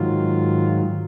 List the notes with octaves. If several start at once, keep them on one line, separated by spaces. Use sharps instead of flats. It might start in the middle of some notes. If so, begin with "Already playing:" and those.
Already playing: G#2 D#3 F#3 F4